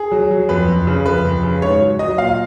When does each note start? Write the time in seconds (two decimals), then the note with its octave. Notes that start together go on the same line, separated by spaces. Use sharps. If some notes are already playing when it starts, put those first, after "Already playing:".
Already playing: G#4
0.12 F#3
0.31 F#3
0.49 F2 B4
0.68 F2
0.87 C#3
1.06 F2 B4
1.25 F2
1.43 C#3
1.62 G#2 C#5
1.81 F#3
1.99 F#3 D#5
2.18 A#2 F5